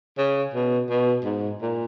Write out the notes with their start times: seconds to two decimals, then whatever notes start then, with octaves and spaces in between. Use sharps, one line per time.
0.18 C#3
0.54 B2
0.90 B2
1.24 G#2
1.61 A#2